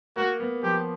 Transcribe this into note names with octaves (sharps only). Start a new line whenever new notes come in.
A#3 F#4
B3
F3 G4